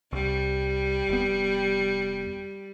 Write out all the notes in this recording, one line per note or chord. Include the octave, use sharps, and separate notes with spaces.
C2 G3
F1 B3